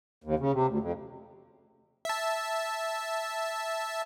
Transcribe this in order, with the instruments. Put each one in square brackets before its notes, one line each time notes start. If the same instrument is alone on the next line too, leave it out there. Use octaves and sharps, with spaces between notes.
[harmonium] D#2
C#3
C3
D2
F2
[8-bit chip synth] E5 A5